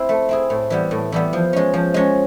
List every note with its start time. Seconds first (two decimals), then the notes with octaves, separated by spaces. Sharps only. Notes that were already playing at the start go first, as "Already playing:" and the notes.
Already playing: C4 E4
0.09 A3
0.29 C4 E4 G#4
0.50 A2
0.70 E3 G3 B3
0.91 A2
1.12 E3 G3 B3
1.33 F3
1.53 G#3 C#4
1.74 F3
1.94 G#3 C#4